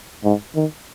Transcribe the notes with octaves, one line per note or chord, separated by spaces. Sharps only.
G#2
D#3